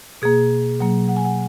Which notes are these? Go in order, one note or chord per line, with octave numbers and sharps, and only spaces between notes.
B2 A#3 G#4
B2 F#3 A#3
F#5
G#5
F#5